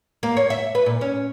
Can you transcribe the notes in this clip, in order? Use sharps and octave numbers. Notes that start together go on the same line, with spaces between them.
A#3
C#5
E5
B4
A#2
C#4